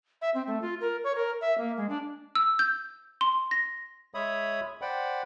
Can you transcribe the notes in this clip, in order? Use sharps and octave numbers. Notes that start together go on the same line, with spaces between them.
E5
C4
A3
F4
A#4
C#5
A#4
E5
A#3
G#3
D4
E6
G6
C6
A#6
G#3 C#5 E5 B5 D#6
C5 D5 F#5 G5 B5